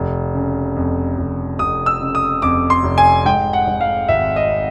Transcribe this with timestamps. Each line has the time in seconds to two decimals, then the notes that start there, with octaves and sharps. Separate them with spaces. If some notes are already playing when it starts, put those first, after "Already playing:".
Already playing: F1
0.35 C#3
0.76 F2
1.18 F1
1.59 F1 D#6
1.86 E6
2.00 C#3
2.15 D#6
2.42 F2 D6
2.70 C6
2.83 F1
2.98 G#5
3.25 G#2 G5
3.53 F#5
3.67 G#2
3.81 F5
4.08 G#1 E5
4.36 D#5